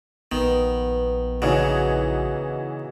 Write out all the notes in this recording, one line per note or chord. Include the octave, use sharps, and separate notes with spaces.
A#1 D#3 B3
C#3 E3 D#4 F#4